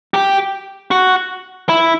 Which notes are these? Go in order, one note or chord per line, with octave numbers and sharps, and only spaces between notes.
G4
F#4
E4